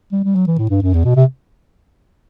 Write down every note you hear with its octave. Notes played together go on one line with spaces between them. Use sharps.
G3
G3
F#3
E3
A2
G2
F#2
E2
B2
C3